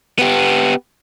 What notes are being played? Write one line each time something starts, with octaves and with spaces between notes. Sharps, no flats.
B3 G4